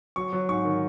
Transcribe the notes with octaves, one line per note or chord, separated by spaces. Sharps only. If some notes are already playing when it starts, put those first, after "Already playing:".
F#3 C#6
F#3
G#2 C#6
D#3